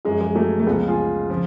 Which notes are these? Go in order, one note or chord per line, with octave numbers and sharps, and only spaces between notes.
F#2 F3 G#3
G#3
F#3 A3
A3
C#2 C#3 F3 G#3 B3
F4 G#4
C#3 F3